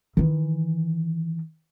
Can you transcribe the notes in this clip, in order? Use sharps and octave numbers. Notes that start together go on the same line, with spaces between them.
D#3 E3